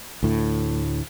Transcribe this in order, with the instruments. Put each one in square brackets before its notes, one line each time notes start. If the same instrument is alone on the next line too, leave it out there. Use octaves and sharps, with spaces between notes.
[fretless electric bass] D2 A2